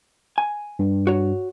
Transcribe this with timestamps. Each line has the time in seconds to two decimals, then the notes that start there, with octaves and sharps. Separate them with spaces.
0.38 G#5
0.79 G2
1.07 F#4 C#5